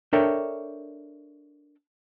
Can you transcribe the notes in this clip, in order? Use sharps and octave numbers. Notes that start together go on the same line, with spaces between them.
D4 A4 A#4 C#5 E5 G5